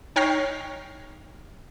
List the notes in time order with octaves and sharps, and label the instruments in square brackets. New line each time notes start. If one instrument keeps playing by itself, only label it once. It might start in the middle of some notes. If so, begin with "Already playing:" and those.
[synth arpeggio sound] D#4 C#5 G5 F6 A#6 C7